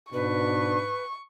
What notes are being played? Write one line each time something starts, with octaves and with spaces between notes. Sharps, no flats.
G#2 B2 D4 B4 C#6